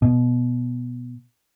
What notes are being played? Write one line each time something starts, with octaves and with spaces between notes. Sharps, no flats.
B2